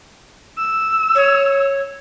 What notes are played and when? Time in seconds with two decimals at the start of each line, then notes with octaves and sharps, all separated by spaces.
0.58 E6
1.15 C#5